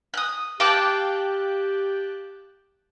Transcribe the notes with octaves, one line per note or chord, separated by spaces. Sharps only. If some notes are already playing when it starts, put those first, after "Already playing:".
D#6 F#6
G4 F5 G5 A5 D6 F#6